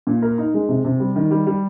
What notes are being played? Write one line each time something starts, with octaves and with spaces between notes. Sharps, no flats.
A#2
A#4
D#4
G#3
C3
C3
G3
D#3
G3
G3